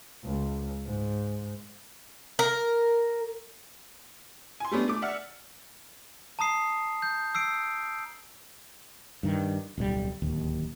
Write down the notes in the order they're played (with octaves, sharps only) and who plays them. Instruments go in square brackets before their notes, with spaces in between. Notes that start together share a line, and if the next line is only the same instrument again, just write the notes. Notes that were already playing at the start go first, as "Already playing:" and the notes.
[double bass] C#2
G#2
[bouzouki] A#4
[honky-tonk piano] G#5 C6
G3 A3 B3 C#4 D4
A3 D6
D5 E5 F#5 F6 C#7
[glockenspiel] A5 A#5 D#6 C7
G6
E6 C7 D7
[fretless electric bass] G2 D#3
D1 B1 A2 G3
D1 D#2